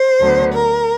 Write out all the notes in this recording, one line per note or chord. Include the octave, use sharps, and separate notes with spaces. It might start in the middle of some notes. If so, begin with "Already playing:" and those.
Already playing: C5
D2 D3 F#3 B3
A#4